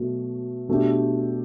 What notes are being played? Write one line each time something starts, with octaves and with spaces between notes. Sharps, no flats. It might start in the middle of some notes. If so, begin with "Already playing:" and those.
Already playing: B2 F#3 A3
B2 A3 D4 G4